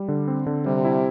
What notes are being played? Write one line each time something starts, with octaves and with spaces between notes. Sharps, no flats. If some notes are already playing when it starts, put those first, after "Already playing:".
Already playing: G3
D3
C4
D3
C3 G3
E4